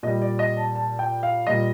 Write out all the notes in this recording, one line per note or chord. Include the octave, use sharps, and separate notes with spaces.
A#2 G3 D#5
D5
D#5
A5
A5
G5
F5
A#2 G3 D#5